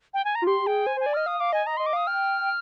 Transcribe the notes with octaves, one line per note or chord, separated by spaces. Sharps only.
G5
G#5
A#5
F4
G4 C6
G#4 G5
C5 G#5
C5 G#5
D5
D#5 F6
F5 D#6
F5 D6
D#5 G#5
D#5 A#5
D#5 C6
D6
F5 D#6
G5 F6